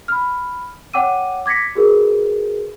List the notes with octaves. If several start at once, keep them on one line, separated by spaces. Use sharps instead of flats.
B5 F6
C#5 F#5 G5 D6 E6 D#7
D6 G#6 A#6 B6 C#7
F#4 G#4 A#4 B4